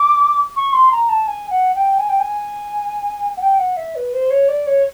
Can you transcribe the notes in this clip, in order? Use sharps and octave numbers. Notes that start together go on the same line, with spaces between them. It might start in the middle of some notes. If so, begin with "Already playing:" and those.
Already playing: D6
C#6
C6
A#5
A5
G#5
F#5
G5
G#5
G5
G#5
F#5
G5
F#5
E5
B4
C5
C#5
D5
C#5